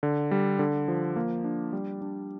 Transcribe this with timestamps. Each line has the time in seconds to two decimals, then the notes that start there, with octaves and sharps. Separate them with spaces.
0.03 D3
0.31 G3
0.59 D3
0.88 F3
1.16 A#3
1.44 D4
1.73 G3
2.01 D4